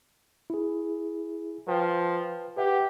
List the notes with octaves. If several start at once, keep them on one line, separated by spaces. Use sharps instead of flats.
E4 G#4
F3 B4 G5
G4 B4 E5 F#5